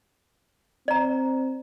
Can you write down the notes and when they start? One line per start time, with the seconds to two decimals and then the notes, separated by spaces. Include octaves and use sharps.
0.88 C4 D5 A#5